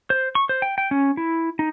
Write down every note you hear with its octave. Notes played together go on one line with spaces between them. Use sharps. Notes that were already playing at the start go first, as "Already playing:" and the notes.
C5
C#6
C5
G5
G5
C#4
E4
D#4